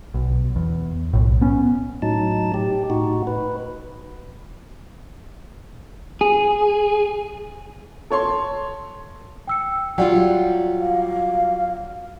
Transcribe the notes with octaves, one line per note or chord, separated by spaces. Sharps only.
B1
E2
B1 A2
B3 C#4
A2 F#3 D#4 A5
G4
A2 D#4 F#4
B4
G#4
A4 C#5 C6
G5 E6 C#7
F#3 G3 F4 D5 F#5 G5
F5